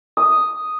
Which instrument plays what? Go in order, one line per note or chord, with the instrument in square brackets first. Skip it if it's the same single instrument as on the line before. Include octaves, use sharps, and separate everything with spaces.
[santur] D#6